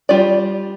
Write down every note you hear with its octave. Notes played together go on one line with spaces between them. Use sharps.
G3 F4 D5